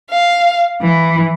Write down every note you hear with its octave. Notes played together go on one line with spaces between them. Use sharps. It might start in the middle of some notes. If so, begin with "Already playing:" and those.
F5
E3